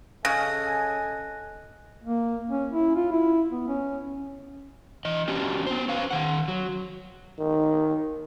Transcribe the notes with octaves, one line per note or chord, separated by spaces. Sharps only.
C#3 A4 D#5 G#5 F#6 A#6
A#3
C#4
E4
F4
E4
B3
C#4
E3 D#5
C#4 D4 F#4 G4
B3 C5
C#4 B4 F5
D#3 F#5
F#3
D#3